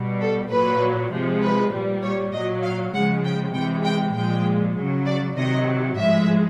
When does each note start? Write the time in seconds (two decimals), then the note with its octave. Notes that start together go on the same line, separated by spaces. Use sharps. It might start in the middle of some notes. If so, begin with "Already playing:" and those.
Already playing: B2 G3
0.21 A4
0.51 A#2 F#3 B4
1.12 C3 F3 G#3
1.42 B4
1.72 A#2 G3
2.03 C#5
2.33 A#2 F#3 D#5
2.63 F5
2.93 C#3 F3 G#3 F#5
3.25 G5
3.54 C3 E3 G#3 G5
3.84 G5
4.15 A#2 F3 G#3 G5
4.75 F#3
4.81 C#3
5.06 D5
5.37 C3 D#3 F#3 D#5
5.97 A2 F3 G#3 E5